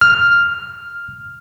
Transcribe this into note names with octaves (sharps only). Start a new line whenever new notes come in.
F6